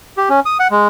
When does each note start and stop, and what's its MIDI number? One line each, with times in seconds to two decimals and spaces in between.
0.17 0.29 67
0.30 0.40 61
0.46 0.57 87
0.60 0.68 78
0.71 0.88 56